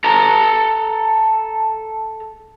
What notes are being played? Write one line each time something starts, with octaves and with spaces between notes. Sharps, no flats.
A4 A#5